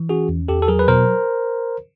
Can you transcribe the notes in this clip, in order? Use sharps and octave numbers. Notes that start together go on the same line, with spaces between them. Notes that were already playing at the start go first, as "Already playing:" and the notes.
Already playing: E3
C#4 F#4 G#4
E2
E2 G4 A4
A4
F#3 G#4 A#4
B4
B2 A#4 C5